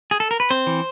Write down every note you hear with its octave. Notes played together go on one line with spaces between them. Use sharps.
G#4
A4
A#4
B4
C4 C5
E3